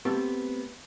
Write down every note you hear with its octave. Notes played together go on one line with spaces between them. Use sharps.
A3 B3 C4 G4 A4